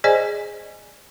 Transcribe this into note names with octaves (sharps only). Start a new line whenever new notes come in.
G#4 C5 D5 D#5 G#5